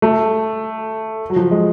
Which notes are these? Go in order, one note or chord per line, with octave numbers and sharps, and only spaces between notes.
A3
F#3
F3
G#3